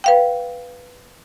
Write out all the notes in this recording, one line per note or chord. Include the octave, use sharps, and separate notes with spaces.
B4 F5 G5